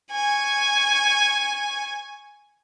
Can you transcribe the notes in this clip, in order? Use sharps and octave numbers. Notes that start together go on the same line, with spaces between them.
G#5 C#6